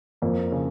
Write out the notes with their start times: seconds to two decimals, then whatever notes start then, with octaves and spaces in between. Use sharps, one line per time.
0.22 F2 A#3
0.52 C#3